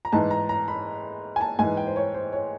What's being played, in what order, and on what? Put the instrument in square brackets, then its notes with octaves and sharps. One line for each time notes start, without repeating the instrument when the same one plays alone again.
[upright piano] A#5
G#2 E3 A5
A#5
A#5
B5
G#5
A5
G#2 E3 G#5
G5
C5
C#5
C5
C#5